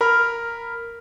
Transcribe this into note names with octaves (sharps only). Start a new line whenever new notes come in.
A#4 B5 F6